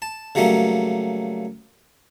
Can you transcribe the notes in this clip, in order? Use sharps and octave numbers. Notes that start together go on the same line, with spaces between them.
A5
C#3 F#3 G3 A3 A#3